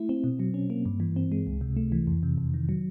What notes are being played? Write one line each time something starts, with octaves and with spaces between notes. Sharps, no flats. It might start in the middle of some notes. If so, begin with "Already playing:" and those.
Already playing: A3 E4
C4
B2
F#3
C#4
A#3
G2
E3
C4
G#3
C#2
C3
A3
E3
F2
C3
F2
D#3
F#3